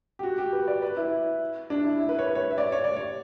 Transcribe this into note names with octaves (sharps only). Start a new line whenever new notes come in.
G4
F#4
G4
B4
D5
B4
E4
D4
E4
E4
B4
C#5
B4
C#5
E5
D5
C#5
D5
C#5